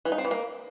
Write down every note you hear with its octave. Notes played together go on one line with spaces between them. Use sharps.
E3
D#4
C4
E3
A#3